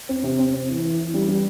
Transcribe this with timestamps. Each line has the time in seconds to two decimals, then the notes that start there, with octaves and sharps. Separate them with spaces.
0.09 C4
0.23 C3
0.39 C4
0.54 C4
0.69 E3
0.83 E3
0.99 E3
1.14 G3
1.28 G3